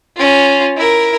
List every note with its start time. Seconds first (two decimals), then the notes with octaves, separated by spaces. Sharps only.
0.17 C#4 F4
0.77 E4 A#4